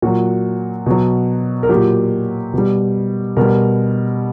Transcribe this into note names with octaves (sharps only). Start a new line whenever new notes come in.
A#2 F#3 F#4
B2 F#3
A#4
A#2 F#3 G4
B2 G3
B2 G3 A#4